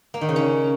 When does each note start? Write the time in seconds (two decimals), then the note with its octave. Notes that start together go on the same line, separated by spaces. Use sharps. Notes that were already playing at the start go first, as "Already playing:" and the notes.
0.14 A#3
0.21 D#3
0.29 C#3
0.36 C#4